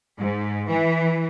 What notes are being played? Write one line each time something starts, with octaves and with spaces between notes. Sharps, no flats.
G#2
E3